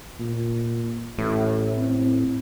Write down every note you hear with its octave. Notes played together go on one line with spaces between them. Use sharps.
A#2
A1 A2
C4